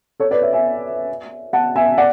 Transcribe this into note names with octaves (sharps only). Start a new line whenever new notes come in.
A4 C#5
B4 D5
C#5 E5
E5 G#5
F#5 A5
E5 G#5
D5 F#5